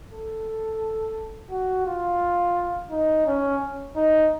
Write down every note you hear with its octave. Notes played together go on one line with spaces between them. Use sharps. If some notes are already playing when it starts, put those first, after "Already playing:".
A4
F#4
F4
D#4
C#4
D#4